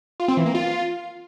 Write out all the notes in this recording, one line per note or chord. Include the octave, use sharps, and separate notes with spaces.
F4
C4
E3
A#3
F4